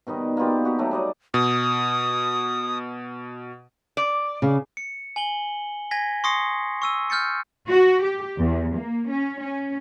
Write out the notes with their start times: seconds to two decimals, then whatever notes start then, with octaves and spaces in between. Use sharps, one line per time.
0.07 B2 D#3 G3 D#5
0.37 A#3 B3 F4 G4
0.65 F#4 G4 A#4
0.78 F#3 A3 D#4
0.91 G3 D5 D#5
1.34 B2 D#6
3.97 D5
4.42 C#3
4.77 C#7
5.16 G#5 F#7 G7
5.91 G#5 G#6 A#6 B6
6.24 C6 C#6 D#6 A#6 C7 C#7
6.82 C#6 E6 D#7
7.10 F6 G6 A6 C#7
7.68 F#4
8.03 G4
8.37 E2
8.74 A#3
9.09 C#4
9.41 C#4